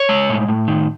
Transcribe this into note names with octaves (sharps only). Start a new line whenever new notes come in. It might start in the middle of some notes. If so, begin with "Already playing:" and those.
Already playing: C#5
G#3
A2
A2
D#3